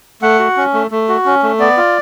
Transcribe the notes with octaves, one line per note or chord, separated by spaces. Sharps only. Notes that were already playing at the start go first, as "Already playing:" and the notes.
A3 F#5
F#4
C#4
A3
A3
F#4
C#4
A3
B3 D5
F4